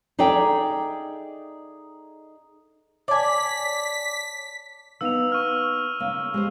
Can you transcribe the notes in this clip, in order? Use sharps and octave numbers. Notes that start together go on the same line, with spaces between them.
D#4 G#4 A4 D5 E5 G5
C#5 D5 G#5 A5 B6
A#3 B3 D#4 E6 F7
C#6 F6
C#3 A#3
G#3 G4 C5